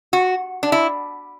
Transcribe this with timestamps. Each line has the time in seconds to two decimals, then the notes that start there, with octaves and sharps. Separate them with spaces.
0.13 F#4
0.63 D4
0.72 E4